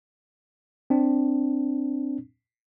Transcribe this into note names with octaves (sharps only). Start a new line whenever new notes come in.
C4 D4